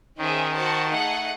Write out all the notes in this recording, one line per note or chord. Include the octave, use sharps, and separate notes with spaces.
D#3 C#4 G#4 C5 E5
F#4 C5 F#5 A5
A3 D#4 G#4 D#5 F#5